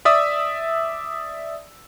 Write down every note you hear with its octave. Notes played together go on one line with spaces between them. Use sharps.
D5 E5 D#6 E6